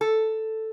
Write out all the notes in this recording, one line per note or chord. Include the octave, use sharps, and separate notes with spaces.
A4